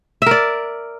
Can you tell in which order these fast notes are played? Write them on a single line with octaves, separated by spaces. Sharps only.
E5 A#4 D5